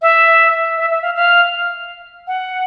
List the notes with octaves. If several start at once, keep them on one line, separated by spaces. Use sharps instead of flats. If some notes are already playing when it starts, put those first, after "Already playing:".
E5
E5
E5
F5
F5
F#5